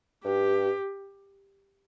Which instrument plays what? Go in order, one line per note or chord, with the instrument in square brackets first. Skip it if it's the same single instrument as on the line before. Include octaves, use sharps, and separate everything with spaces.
[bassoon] G2 [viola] G4